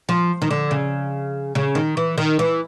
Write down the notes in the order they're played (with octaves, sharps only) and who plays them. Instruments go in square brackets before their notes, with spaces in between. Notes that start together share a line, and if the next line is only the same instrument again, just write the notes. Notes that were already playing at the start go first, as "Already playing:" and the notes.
[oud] F3
D#3
D3
C#3
C#3
D#3
E3
D#3
E3